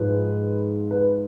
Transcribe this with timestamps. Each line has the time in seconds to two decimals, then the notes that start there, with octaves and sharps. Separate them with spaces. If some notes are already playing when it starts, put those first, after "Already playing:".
Already playing: G#2 F3 G#3 B4
0.91 B4